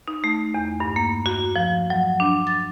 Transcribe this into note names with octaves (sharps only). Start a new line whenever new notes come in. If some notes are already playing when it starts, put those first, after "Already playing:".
D#4
A3
E2
G2
A#3
F#4
F3
F#3
D4
A6